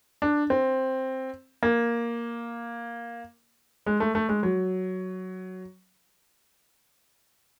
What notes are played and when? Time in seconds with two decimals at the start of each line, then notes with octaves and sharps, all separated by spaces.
0.22 D4
0.50 C4
1.63 A#3
3.87 G#3
4.00 A3
4.15 A3
4.29 G#3
4.43 F#3